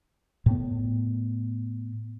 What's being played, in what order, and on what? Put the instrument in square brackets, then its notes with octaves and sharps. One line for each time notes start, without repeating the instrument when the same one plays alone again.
[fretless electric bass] A2 B3